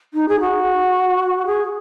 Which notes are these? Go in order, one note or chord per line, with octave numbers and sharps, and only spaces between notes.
D#4
G#4
F#4
G#4